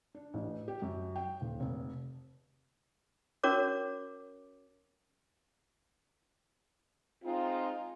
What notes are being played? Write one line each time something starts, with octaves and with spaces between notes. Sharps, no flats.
D4
A1
G4
F#2
G5
D#1
F1
C#4 F#4 A#4 C#5 D6
G#3 C4 D#4 F4